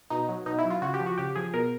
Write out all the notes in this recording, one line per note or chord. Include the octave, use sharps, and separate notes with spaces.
B2 D#4
F#3
B2 D#4
E4
F#3
F4
C#3 F#4
G4
F3
F#4
C#3 G4
F3 G#4
B2 A#4